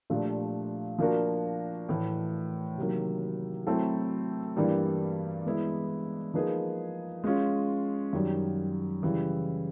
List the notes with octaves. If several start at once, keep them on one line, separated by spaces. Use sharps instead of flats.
A#2 F3 A3 D4 G4
F3 A#3 D4 F#4 A#4
A2 E3 A3
C3 D#3 F#3 A#3
F#3 A3 C4 E4 A4
G2 E3 G3 A#3
E3 G#3 B3 E4
F3 A#3 D#4 G#4 B4
G#3 C#4 F4
F#2 D#3 G3
C#3 E3 G3